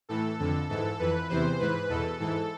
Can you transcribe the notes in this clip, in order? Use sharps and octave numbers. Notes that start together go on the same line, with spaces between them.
A2 E3 A4
F2 D3 A4
G#2 E3 A4
F2 E3 B4
E2 C3 E3 C5
G#2 E3 B4
E2 B2 A4
G#2 E3 A4